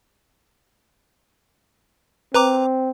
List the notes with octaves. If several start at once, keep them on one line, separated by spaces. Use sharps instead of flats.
C4 B4 A#5 D6